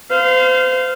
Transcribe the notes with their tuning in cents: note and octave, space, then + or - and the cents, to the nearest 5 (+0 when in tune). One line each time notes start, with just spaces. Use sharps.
C5 -35 F5 -5